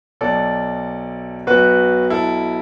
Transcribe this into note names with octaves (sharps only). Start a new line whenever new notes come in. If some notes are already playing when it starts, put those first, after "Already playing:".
B1 B2 A4 D5
B1 B2 F#4 B4
E4 A4